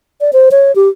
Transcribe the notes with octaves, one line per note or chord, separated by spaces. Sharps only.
D5
C5
C#5
G4